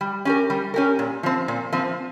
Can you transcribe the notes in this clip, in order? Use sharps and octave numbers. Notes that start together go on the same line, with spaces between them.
G3
C#4 G4 A#4
G3
C#4 G4 A#4
A#2
F3 C4
A#2
F3 C4